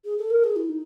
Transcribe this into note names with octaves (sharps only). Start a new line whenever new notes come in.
G#4
A4
A#4
G#4
E4
D#4